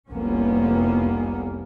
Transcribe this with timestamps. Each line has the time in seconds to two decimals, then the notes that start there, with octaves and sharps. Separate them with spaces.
0.10 F1 C2 F2 A#3 B3 C#4